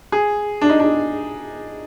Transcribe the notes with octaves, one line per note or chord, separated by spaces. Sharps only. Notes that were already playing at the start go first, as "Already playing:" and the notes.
G#4
D4
D#4
D4